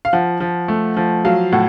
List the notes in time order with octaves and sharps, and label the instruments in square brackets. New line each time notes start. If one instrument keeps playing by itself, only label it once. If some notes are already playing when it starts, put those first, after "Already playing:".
[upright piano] F5
F3 F#5
F3
A3
F3
F#3 F5
A2 F#5